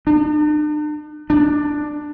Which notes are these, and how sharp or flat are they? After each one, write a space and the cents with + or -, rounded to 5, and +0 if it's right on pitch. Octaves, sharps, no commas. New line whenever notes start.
D4 +45
D4 +10